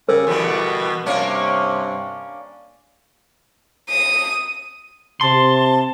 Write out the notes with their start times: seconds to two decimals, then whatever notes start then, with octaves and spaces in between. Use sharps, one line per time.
0.09 C#3 G4 A#4
0.27 E2 B2 D3 G3
1.06 G2 C3 A#3 C#4 D4
3.90 D#6
5.21 C3 A5 C6